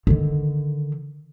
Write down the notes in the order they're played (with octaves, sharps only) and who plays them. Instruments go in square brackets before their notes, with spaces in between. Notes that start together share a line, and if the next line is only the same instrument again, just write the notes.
[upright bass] D3 D#3